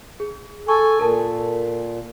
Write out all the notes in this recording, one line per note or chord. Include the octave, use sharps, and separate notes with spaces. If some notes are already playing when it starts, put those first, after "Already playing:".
G#4
A4 G#5 C#6
A#2 A4 A#4 A5